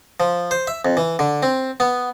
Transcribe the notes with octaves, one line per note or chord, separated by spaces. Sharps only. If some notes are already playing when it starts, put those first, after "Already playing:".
F3
C5
E5
F2
E3
D3
C4
B3